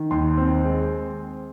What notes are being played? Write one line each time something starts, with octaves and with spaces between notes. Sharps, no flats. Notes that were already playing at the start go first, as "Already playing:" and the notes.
Already playing: D#3
D#2 C6
C4
G#3